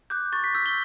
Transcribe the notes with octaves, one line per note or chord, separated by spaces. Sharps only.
D6 F#6 G6
C#6 A6
B6
E6 G6 B6
G7